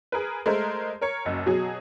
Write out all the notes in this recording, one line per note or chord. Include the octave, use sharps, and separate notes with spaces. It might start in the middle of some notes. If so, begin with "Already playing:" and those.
G#4 A#4 B4
G#3 A3 A#4 C5
A#4 C#5 C#7
F#1 B1 F#2
B2 F#3 G#4